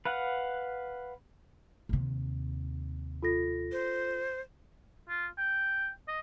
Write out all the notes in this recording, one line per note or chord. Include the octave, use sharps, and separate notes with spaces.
B4 F5 F#5
D#2 C3
F4 A4 A#6
C5
F4
G5
D#5